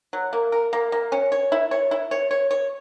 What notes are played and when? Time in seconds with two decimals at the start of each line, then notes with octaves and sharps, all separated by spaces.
0.13 F#3
0.33 A#3
0.52 A#4
0.73 A#3
0.92 A#3
1.12 C#4
1.32 C#5
1.52 E4
1.71 C#5
1.91 E4
2.11 C#5
2.31 C#5
2.51 C#5